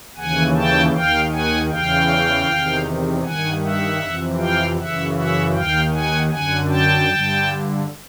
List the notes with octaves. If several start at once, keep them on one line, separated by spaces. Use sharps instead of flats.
D#2 C#3 E3 F#5 G#5
G5 A5
D#2 D#3 F5 G5
F#5 G#5
E2 C#3 E3 F5 G5
E2 C3 D#3
G2 D#3 F#5 G#5
E5 F#5
F2 C3 E3
F5 G5
F#2 C#3 E3 E5 F#5
E5 F#5
D#2 D#3 F5 G5
F#5 G#5
F#2 D3 F#5 G#5
G5 A5
G2 D3